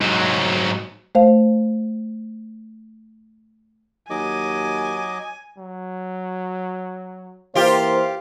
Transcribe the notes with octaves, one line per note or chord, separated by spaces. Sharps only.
G#2 F#3
A3 C5 F5
D#2 F#3 D#5 G#5 D6
F#3
E3 A#3 F4 G4 C5 F5